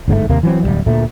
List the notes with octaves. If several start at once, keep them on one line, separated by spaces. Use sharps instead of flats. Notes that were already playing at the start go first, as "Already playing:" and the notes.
G1 G#2 C#3 A3
D#2 C3 A#3
E3 F#3 C4
D1 C#2 G3
D2 A#2 A3